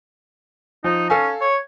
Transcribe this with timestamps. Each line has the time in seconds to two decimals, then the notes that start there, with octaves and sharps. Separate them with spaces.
0.84 F3 D#4
1.10 C#4 A4 F5 G#5
1.41 C#5